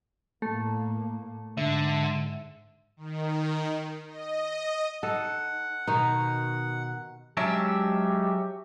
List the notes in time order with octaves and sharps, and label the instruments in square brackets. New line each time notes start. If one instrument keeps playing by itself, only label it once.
[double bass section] A2 A#3 [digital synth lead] A3
[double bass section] G#2 [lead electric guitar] D3 [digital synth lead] E5
[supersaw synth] D#3
D#5
[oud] D#4 [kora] A4 [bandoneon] F#5
[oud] B2 D#3 [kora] D#4
[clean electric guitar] F#3 C#4 D4 [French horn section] G#3 [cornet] G4 [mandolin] E5